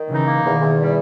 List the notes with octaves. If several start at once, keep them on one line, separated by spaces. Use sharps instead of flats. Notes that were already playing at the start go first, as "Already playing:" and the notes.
Already playing: D#3
C#3 E3 D#4
A#3
E2 B2 D#3
E2
G3